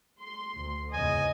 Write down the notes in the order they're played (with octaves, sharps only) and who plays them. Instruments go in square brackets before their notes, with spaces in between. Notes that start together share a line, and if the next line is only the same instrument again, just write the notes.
[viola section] C6
[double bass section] D2
[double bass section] E2 G#2 C#3 [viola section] D#5 [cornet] G#5